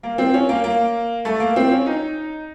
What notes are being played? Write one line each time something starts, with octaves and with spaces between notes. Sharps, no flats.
A#3
C4
C#4
A#3
A#3
A3
A#3
C4
C#4
D#4